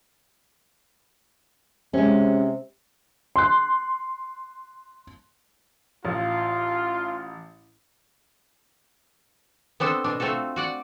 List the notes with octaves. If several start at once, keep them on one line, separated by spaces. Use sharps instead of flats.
C3 G#3 C#4
C6 F#6
A1 F4
B3 C4 D4 A4 C5
B2 D4
A3 C4 F4 F#4 A4
F#4 D5 F#5